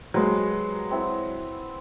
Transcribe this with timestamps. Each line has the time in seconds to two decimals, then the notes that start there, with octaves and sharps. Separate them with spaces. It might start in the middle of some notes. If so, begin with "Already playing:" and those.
0.14 F#3 G#3 G4 B4 C5
0.91 C4 E4 F#5